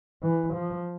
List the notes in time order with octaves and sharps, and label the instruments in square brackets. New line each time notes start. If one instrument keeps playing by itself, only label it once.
[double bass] E3
F3